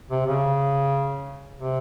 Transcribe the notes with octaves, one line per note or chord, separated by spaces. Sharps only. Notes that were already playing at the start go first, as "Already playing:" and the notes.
C3
C#3
C3